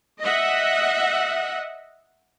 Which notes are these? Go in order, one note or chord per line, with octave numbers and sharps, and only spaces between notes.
D#5 E5 F#5